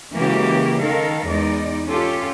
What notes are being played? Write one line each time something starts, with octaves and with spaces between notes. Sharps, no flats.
C#3 E3 G#3 A#3 F#4 G4
D#3 A4 A#4 F5
E2 G#3 D#4 D5
C#4 F4 G4 A4